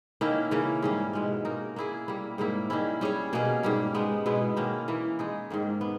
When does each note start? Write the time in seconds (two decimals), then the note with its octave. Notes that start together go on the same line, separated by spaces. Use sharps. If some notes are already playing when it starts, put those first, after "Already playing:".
0.21 D#3 A#3 C#4 E4
0.51 C#3 E3 A#3 C#4
0.82 G#2 G3 C#4
1.13 B2 G#3 C#4
1.45 A#3 D#4 A#4
1.76 A#3 E4 G#4
2.08 G3 A#3 E4
2.38 G#2 G3 A#3 E4
2.70 D#3 G3 C#4 E4
3.01 G3 C#4 G#4 C#5
3.33 B2 A#3 C#4 G#4
3.63 G#2 G3 A#3
3.94 G#3 B3 D#4
4.26 B2 G#3 B3 E4
4.57 D#3 A#3 C#4
4.88 E3 A#3 E4
5.19 G#3 D#4 G#4
5.50 G#2 D#3 A#3
5.81 B3